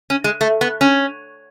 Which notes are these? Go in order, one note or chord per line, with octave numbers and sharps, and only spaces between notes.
C#4
G#3
A3
B3
C#4